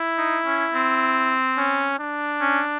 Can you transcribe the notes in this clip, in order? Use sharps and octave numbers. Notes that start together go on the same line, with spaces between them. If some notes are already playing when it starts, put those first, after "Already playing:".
Already playing: E4
D#4
C#4
C4
C#4
D4
C#4